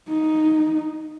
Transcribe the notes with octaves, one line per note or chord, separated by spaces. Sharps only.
D#4